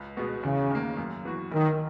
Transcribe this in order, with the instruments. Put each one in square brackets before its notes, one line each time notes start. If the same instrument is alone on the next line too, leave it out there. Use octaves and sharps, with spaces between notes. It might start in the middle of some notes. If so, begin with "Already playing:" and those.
Already playing: [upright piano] C#2
B2 G#3 B3 F#4
[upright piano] E2 [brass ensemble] C#3
[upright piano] D#3 A#3
F#2
E3 B3 F#4
[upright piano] B1 [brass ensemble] D#3